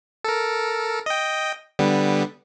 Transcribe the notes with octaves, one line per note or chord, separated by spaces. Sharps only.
A4 A#4
D#5 G5
D3 G3 B3